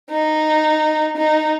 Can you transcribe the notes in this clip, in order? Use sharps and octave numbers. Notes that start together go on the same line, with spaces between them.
D#4
D#4